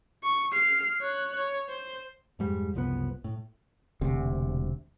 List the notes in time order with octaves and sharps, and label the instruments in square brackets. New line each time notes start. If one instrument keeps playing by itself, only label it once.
[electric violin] C#6
F6 C7
C#5 F#6
C#5
C5
[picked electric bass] F2 G#2 G3
F#1 C2 F3 B3
A2
[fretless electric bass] E1 D2 C3